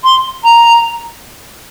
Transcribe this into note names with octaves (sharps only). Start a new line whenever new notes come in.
C6
A#5